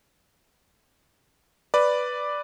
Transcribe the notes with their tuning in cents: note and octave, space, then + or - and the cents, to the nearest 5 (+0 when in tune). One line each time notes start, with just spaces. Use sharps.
B4 +0 D5 +0